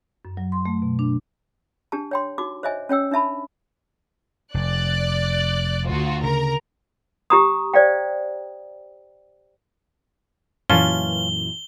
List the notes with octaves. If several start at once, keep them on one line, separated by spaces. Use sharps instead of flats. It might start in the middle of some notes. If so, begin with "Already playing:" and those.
F#2
F#3
C6
A3
B2
D4
D4 G4 A5
C#5 G5 C6
D#4 F#4 D6
C5 C#5 D#5 E5 G#5
C#4 C#5 G5 E6
D4 D#4 E5 A5 B5
F1 D5 F#6
D2 F4 F#4
C#3 A#4 A#5
G4 A#5 D#6
C5 D5 F5 G5
F#2 A#2 E3 C#4 F4 A5 G7